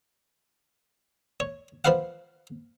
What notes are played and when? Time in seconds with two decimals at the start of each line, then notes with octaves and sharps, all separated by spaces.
1.40 C#5
1.85 F3 B4 C5 F5 F#5